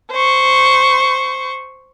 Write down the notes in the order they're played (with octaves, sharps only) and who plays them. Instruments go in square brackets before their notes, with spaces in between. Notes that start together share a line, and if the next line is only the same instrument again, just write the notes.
[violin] C5 C#6